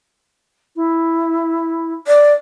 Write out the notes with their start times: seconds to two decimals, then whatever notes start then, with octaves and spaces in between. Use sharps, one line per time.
0.76 E4
2.07 D5